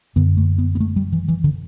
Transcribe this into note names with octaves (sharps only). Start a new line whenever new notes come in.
F#2 D3 B3
A3
B3
B3
A3
G3
E3
E3
D3